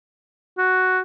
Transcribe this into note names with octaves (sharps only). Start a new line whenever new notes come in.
F#4